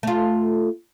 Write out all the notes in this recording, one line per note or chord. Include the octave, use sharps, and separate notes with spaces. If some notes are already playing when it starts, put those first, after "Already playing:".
A3 F4